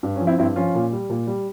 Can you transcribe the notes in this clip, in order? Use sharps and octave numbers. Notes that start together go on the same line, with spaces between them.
G2
C#4
F3
C4 E4
G2 C4 E4
F3 C#4 F4
A#2
G3
A#2
G3